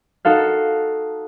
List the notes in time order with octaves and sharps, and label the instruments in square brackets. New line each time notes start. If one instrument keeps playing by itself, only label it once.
[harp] D#4 F#4 A4 F5